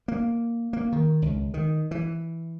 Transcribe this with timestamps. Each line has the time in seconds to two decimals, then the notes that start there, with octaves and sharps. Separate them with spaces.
0.08 A#3
0.73 A#3
0.92 D#3
1.22 C#2
1.54 D#3
1.91 E3